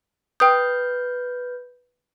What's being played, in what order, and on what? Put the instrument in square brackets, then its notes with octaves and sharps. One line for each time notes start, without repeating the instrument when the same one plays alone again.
[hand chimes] B4 G6 [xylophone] G5 D#6